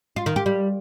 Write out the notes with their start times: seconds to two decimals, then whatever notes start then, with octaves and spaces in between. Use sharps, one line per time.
0.16 F4
0.26 D#3
0.36 G4
0.46 G3